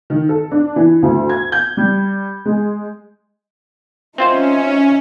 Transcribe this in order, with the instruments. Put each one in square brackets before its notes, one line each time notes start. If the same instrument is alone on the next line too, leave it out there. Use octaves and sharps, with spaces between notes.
[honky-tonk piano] D#3
A4
D4
E3
D2
G#6
G6
G3
G#3
[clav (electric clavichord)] C4 F4 C5 [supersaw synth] C#4 [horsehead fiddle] D#4 E5